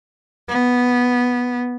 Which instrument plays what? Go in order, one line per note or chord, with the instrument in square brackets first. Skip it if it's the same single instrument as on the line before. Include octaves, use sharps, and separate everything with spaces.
[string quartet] B3